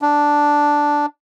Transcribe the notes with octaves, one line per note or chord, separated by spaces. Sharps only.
D4